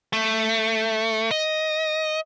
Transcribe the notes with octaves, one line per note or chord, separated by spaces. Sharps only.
A3
D#5